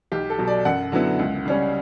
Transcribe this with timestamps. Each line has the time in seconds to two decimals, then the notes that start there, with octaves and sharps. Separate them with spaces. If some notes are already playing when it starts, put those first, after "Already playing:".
0.12 B1 G4
0.30 A4
0.38 B2 F#3
0.48 D5
0.65 F#2 F#5
0.92 D3 F#3 B3 E4
1.19 C#2
1.45 C#3 G3 C#4